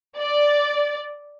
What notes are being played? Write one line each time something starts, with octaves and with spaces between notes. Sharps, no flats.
D5